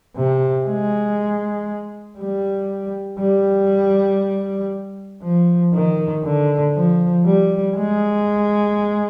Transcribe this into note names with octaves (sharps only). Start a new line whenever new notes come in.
C3
G#3
G3
G3
F3
D#3
D3
F3
G3
G#3